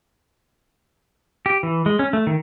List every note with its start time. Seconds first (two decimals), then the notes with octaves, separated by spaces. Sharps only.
1.46 G4
1.63 E3
1.86 G#3
1.99 C#4
2.13 A3
2.27 D#3